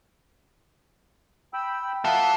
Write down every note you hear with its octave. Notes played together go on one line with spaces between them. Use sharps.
G5 B5 E6
A#3 F4 E5 F#5 A5